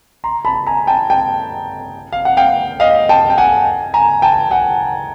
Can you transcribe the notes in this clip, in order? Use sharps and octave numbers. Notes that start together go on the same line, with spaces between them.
A#5 C6
A5 B5
G#5 A#5
G5 A5
G5 A5
F5
F#5
F5 G5
D#5 F5
G5 A5
G5
F#5 G#5
G#5 A#5
G5 A5
F#5 G#5